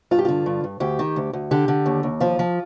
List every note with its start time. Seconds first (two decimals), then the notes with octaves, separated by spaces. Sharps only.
0.11 G2 F4
0.19 G4
0.25 D3 F4
0.46 G2
0.64 G2
0.80 D2 G4
0.99 D#3
1.16 D2
1.33 D2
1.51 D3 G4
1.68 D3
1.86 D#2
2.03 D#2
2.20 F3 F4
2.39 F3